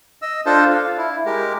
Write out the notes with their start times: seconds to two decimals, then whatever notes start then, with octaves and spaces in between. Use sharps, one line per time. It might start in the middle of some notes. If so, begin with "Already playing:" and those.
0.22 D#5 E6
0.46 D4 F4 A4 C5 A5
0.70 F5
0.98 E4
1.25 G#3 G4 A#4